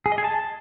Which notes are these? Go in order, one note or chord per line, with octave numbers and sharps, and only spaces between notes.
G#4
D#5
G#4
A5